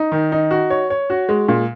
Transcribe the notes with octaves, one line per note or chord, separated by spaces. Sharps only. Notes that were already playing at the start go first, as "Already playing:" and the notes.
Already playing: D#4
D#3
D#4
F#4
C#5
C#5
F#4
G#3
A#2